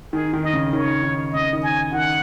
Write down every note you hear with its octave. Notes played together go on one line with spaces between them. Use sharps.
D#3 G#4
D#3
D#5
C#3
D#3 C#5
D#3
C#3 D#5
D#3
G#5
D#3 F#5